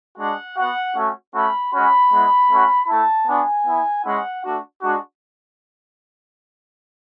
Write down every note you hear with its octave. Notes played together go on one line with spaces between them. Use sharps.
G#3 D4 F#4 F#5
B3 F#4 F#5
A3 C#4 F#4
A3 C#4 F#4 B5
G#3 C#4 F#4 B5
G#3 B3 E4
A3 C#4 F#4
A3 E4 A5
B3 D4 F#4 G#5
B3 E4
G#3 C#4 E4 F#5
A3 D4 F#4
G#3 D4 F#4